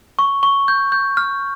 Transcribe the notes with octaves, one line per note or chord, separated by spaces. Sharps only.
C#6
C#6
G6
G6
F6